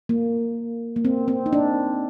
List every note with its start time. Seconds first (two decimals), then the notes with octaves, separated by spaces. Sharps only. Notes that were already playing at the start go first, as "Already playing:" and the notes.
0.09 A#3
0.96 A#3
1.05 C4
1.28 C4
1.46 D#4
1.53 D4